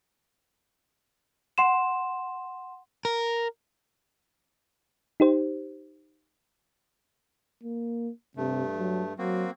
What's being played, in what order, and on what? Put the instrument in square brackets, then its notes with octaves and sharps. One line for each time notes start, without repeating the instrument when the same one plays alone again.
[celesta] F#5 C6 E7
[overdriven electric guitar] A#4
[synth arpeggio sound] D#4 G4 C5
[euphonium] A#3
[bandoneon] G2 A3 [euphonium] C3
[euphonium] F#3
[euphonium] F#3 [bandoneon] A#3 C4 F#4